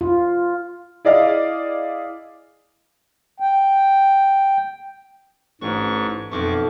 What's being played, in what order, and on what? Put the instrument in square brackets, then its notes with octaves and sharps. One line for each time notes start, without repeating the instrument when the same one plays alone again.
[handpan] F4
[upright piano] E4 G#4 D5 D#5 F5
[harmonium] G5
[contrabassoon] A1 [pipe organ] G#2 C#6 [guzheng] D4
[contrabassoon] B1 [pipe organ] F2 C#6 D6 [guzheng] B2 F3 A3